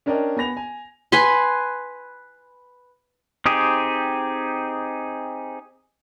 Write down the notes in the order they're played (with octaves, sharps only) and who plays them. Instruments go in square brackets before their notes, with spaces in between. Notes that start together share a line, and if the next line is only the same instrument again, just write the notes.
[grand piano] C#4 D4 A#4 D5 D#5 G5
B3 G#5 B5 A#6 F7
G#5
[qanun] B4 G#5 B5 C6
[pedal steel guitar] C4 D#4 G4 G#4